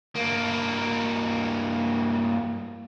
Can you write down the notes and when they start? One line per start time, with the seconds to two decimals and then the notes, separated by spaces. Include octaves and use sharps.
0.15 G2 A#3